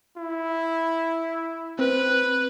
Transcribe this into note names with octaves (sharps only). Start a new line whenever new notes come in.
E4
C4 B4